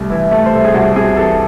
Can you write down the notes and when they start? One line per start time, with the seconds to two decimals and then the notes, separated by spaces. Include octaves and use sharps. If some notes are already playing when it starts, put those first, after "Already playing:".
Already playing: C2 A3
0.10 E3 E4
0.31 A3
0.46 C5
0.53 C2 A4
0.65 G#4
0.74 C2 F#4
0.96 C3 G#4
1.17 E3 A4